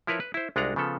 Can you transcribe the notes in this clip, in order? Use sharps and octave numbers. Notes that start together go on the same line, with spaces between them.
F3 E4 A#4 B4 C#5
B4
E4 C5
C2 G#3 D4 F4 F#5 A#5
C#3 F3 B3 A4